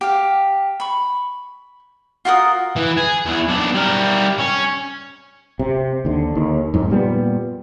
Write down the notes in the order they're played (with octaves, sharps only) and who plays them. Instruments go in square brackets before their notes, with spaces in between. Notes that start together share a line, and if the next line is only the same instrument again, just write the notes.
[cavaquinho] G4 F5
B5 C#6
F4 F#4 A#4 D#6
[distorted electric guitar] E3
G#4
E2 B3
B1 D4
G3 A#4
C#4
[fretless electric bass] C3
D#2 D3
D#2
F2 G#2
A#2 G3 A#3 B3